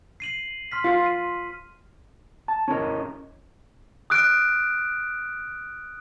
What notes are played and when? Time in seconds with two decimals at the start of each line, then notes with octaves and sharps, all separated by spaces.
0.20 C7 D#7 F#7
0.72 C6 F6 B6
0.84 F4
1.06 D#7
2.48 A5
2.68 C#4 E4 A#4 D#5
4.10 D#6 F6 F#6 D7